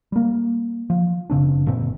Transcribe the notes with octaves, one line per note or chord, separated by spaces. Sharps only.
G3 A#3
F3
F#1 C#3 C4 D4
F#1 A#2 D3 C4